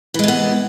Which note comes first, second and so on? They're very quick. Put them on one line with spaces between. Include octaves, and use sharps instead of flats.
E3 G#3 C3 B3